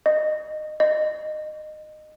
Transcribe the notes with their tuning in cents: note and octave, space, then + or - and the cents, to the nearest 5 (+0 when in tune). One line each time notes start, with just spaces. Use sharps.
D#5 -20
D#5 -20